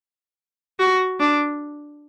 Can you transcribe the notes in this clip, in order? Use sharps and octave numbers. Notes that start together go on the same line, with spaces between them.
F#4
D4